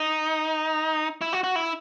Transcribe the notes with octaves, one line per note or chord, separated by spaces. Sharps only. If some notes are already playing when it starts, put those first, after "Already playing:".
Already playing: D#4
E4
F#4
F#4
E4